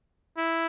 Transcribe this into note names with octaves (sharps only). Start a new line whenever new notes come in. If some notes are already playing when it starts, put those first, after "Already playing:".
E4